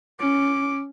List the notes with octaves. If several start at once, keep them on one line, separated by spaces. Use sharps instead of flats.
C#4 D6